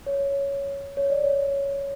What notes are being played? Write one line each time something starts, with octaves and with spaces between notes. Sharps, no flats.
C#5
C#5
D5
C#5